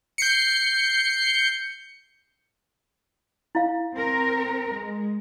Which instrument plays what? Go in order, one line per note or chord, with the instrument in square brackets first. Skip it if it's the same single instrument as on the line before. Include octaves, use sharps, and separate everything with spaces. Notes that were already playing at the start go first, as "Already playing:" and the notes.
[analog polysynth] G6 C7 C#7
[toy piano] E4 F5
[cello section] C4 A#4
G#3